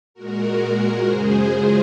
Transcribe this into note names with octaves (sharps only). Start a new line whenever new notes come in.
A#2 G#3 F#4 A#4
F#2 C#3 G#3 G#4 C5
F4 G#4